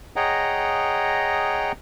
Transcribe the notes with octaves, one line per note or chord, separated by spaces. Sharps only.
G#4 C#5 D#5 F#5 G5 A#5